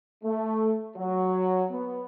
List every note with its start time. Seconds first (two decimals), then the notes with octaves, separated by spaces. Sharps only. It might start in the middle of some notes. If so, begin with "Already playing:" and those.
0.24 A3
0.96 F#3
1.71 B3